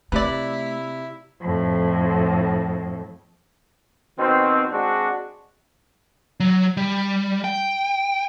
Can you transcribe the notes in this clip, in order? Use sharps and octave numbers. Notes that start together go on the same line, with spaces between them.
C3 A3 E4 B4 D5
F2 A2
B2 D#3 C4
G#3 C4 D4 F#4
F#3
G3
G5